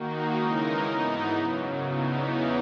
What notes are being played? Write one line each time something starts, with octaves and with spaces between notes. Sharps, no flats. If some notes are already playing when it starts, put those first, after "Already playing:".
Already playing: D#3 A#3 D#4 F#4
C#3 E3 G#3 D#4 A#4
G#2 E3 B3 D#4
F#2 C#3 F#3
E2 C#3 E3 B3 D#4